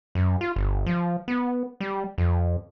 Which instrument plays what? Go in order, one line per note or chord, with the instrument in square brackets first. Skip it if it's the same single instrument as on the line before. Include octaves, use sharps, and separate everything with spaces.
[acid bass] F#2
F4
G1
F3
B3
G3
F2